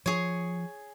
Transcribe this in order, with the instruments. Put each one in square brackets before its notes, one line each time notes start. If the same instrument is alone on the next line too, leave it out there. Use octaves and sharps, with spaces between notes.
[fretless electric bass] F3 [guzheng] G#4 C#5